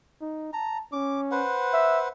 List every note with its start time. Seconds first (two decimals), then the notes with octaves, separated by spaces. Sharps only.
0.21 D#4
0.53 A5 A#5
0.93 C#4 D6
1.32 B4 C5 F#5
1.73 E5